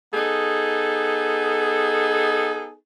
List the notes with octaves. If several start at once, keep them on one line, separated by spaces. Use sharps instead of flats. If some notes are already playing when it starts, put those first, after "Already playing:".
B3 D#4 G#4 A4